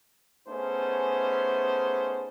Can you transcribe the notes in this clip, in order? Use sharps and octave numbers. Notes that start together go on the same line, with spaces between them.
A3 B3 C#4 D#4 G#4 C5